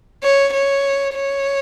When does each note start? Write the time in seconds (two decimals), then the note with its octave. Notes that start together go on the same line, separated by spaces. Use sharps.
0.23 C#5
0.53 C#5
1.13 C#5